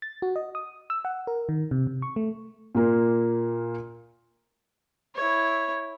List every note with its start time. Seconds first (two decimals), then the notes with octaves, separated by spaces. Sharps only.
0.02 A6
0.22 F#4
0.36 D#5
0.55 D#6
0.90 E6
1.05 F#5
1.27 A#4
1.49 D#3
1.71 C3
1.87 C3
2.02 C#6
2.16 A3
2.75 A#2 A#3
5.15 E4 C#5